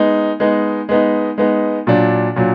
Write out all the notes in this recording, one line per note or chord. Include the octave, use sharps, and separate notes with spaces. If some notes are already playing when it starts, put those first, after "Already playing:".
Already playing: G#3 B3 D#4
G#3 B3 D#4
G#3 B3 D#4
G#3 B3 D#4
A#2 F#3 D4
A#2 F#3 D4